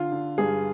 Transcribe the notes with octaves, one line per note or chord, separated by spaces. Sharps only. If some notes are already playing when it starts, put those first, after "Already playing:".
Already playing: D3 F4
D3
G2 G#4